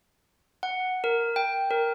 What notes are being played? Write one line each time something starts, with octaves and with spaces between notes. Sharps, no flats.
F#5
A#4
G5
A#4